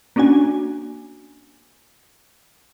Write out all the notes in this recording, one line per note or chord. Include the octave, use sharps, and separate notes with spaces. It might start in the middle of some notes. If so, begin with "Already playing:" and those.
A#3 C#4 D4 F#4 G#5